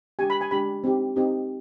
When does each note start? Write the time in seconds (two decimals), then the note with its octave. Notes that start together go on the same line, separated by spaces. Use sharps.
0.19 G#3 D4 G4 G#5
0.30 B5
0.41 G#5
0.51 G#3 D4 G4 B5
0.84 C4 D#4 G4
1.16 C4 D#4 G4